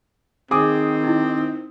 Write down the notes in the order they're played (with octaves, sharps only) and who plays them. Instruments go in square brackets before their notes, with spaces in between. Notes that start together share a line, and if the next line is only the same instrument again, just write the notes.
[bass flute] D#3 [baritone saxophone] C4 [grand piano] G#4 D6 D#6
[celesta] D#4 E4